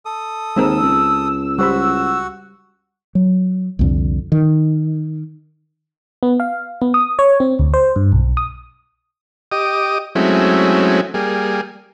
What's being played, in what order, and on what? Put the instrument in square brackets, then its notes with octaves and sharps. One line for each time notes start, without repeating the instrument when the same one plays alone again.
[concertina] A4 D#6
[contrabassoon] D#2 [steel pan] G#3 C4 A#4 [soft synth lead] E6
[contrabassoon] C#2
[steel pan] G3 C5 B5 [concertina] F#4 F#5
[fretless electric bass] F#3
C2 F2 D3
D#3
[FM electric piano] B3
F5
B3
D#6
C#5
C4
D2
C5
G2
B1
D#6
[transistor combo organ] G4 D#5 D6 D#6
F#3 G#3 A3 C4 C#4 E4
G3 A#3 G#4